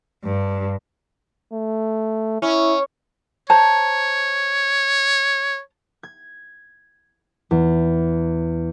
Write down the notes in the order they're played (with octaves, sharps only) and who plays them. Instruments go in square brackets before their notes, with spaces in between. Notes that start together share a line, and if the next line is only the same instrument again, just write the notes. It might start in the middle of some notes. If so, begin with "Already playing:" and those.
[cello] G2
[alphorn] A3
[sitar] C#4 [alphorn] E4
[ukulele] C5 A5 A#5 [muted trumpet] C#5
[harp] G#6
E2